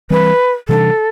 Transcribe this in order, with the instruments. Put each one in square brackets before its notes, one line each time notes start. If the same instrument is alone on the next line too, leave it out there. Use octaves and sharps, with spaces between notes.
[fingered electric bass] E3 G3 C4 [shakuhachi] B4
[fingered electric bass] C3 E3 G3 D4 [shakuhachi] A4